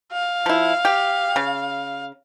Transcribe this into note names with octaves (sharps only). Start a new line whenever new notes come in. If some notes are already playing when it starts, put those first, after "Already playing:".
F5
F3 E4
G4
C#3